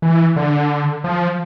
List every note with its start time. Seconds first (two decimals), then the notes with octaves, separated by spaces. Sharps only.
0.02 E3
0.36 D3
1.04 F3